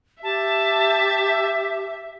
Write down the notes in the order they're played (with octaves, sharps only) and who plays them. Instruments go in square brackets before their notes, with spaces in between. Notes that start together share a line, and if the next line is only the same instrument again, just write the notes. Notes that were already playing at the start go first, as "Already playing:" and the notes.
[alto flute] G4 [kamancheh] E5 [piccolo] A5